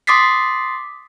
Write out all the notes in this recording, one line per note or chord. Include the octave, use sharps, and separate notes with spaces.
C6 D6 D#6 A6 B6 C7